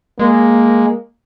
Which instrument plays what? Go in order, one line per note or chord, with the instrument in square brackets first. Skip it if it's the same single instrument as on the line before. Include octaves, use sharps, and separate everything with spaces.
[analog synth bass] G#3 [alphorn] A#3